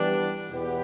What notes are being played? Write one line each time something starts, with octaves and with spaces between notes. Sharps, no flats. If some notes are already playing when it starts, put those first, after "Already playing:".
Already playing: E3 G3 B3 D4
E2 B2 B3 G4